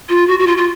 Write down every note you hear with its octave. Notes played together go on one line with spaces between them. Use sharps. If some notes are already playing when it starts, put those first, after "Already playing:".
F4
F#4
F#4
F4
F4